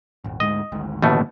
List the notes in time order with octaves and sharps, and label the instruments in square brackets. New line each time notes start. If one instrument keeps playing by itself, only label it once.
[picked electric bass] D#1 G#1
[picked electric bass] D2 G#2 G#3 [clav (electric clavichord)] D#5
[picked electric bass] G#1 D2 G#2
[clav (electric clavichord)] A1 B2 A3 [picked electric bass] D3 D#3 A#3